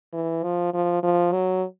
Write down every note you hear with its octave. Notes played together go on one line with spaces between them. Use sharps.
E3
F3
F3
F3
F#3